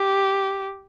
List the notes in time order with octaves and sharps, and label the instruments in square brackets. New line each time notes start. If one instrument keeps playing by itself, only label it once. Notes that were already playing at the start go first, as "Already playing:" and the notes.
Already playing: [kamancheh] G4